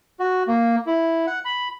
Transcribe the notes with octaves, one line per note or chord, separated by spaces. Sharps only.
F#4
A#3
E4
F#5
B5